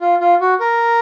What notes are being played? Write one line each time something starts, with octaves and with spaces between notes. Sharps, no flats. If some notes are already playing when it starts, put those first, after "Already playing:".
F4
F4
F#4
A#4